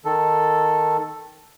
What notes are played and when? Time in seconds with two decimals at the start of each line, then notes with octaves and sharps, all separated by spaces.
0.05 D#3 A4